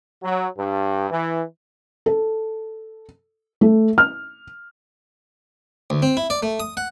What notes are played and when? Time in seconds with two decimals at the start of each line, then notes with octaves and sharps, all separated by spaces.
0.22 F#3
0.57 G2
1.10 E3
2.06 A4
3.61 A3
3.98 F6
5.90 D2
6.02 C4
6.17 E4
6.30 D5
6.43 A3
6.60 D#6
6.77 F#5